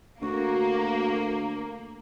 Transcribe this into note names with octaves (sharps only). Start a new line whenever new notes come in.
D2 A#3 F#4